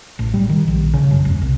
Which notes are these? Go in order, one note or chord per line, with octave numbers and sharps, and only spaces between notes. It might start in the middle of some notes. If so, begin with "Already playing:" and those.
A1
G3
D#3
A#1
C#3
F#1
E1
C2